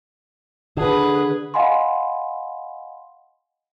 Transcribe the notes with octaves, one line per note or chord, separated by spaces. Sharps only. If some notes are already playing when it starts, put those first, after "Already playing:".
D3 G#4 B4
D#5 F5 F#5 G#5 B5 C6